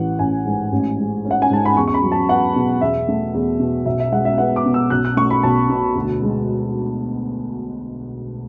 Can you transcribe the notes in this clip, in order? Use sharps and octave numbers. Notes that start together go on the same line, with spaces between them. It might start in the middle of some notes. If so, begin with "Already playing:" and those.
Already playing: A1 E3 F#5
A1 G#5
G#2
A1
G#3
C#4
F#5
G#5
G#2 A5
B5
E2 C#6
C#6
B5
F#3
A5
B3 F#5
B2
E2 E5
A3
E2
B2
B1 E5
E5
G#3 F#5
E5
B3 F#5
D6
B2
E6
B1 F#6
F#6
A3 C#6
B5
B1 A5
B2
D2
G#3